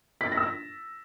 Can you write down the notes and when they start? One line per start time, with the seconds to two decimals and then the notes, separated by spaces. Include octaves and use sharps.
0.21 B6
0.26 A6
0.32 A#6
0.37 E6
0.43 A#6